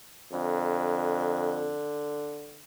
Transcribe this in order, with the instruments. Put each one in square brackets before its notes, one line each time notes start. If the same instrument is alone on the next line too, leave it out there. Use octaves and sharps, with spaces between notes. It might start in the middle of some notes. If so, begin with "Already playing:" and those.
[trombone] F2 [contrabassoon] D3